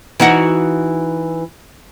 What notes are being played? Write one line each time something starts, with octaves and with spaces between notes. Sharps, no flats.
E3 D#4 F#4